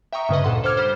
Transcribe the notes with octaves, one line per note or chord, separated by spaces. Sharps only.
E5 G5 A#5 C#6 D#6
G2 C#3 B4 D#5
D2 A#2 A4 F#5 C6
A4 C5 D6 E6 F6 G#6
G3 C5